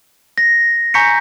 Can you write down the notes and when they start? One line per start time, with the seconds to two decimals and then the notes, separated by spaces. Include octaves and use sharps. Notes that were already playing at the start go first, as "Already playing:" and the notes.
0.38 A#6
0.94 G#5 A#5 C#6 G6 B6 C#7